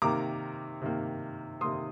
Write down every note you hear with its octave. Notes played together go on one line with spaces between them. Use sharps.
C3 D#3 A#3 A#5 D6
C3 D#3 A#3
C3 D#3 A#3 C6 D#6